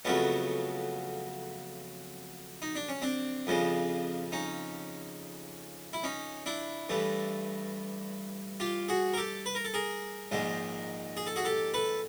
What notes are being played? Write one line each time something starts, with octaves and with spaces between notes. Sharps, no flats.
F2 C#3 F#3 A3 B3 C#4
D#4
D4
C#4
C4 D4
F2 C#3 F3 G#3
C#4 D#4
E4
C#4 D#4
D4 E4
G2 E3 A3
F4 G4
F#4 G#4
A#4
G4 A4
B4
A#4
A4
G#4 A#4
A#1 G#2 D#3 G#3
G#4
A4
F#4 G#4
G4 A4
A4 B4